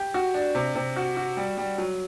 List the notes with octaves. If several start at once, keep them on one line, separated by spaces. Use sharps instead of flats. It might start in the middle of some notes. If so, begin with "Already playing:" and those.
Already playing: G4
F#4
D4
C3
C3
F#4
F#4
G3
G3
F#3